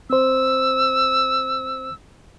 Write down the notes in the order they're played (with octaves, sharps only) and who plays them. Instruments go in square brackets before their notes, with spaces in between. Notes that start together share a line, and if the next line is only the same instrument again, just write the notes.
[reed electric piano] C4 C5 [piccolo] E6